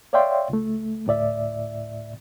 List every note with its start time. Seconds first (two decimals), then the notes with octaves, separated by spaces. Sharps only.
0.13 C#5 D5 E5 F5 G5 C6
0.50 C#2 A3
1.07 D2 A2 D5 E5